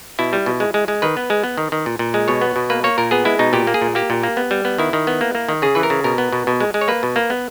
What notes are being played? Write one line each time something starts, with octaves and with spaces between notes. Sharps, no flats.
B2 E4
G3
B2
G#3
G#3
G#3
D#3 B4
B3
G#3
B3
D#3
D#3
A#2
A#2
G#3
B2 C#5
B3
B2
A#3 B4
A#3 C#5
A#2 A#4
B3 G#4
G#3 E4
B2 D#4
A#2 G4
A#3
G#4
A#2
A#3 G4
A#2
A#3
B3
G3
B3
D#3 E4
D#3
B3
A#3
A#3
D#3
C#3 G#4
E3 B4
A#4
C#3
B2 A#4
B3
B2
B2
G#3
G#3
C#5
A#3 B4
B2
A#3
B3